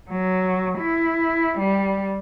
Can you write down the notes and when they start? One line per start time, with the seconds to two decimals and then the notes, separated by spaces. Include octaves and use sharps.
0.10 F#3
0.79 E4
1.59 G3